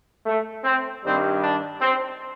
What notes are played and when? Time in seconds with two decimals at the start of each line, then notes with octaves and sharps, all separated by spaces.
0.26 A3
0.64 C4
1.03 G2 D#3 G3 C4
1.42 D4
1.81 C4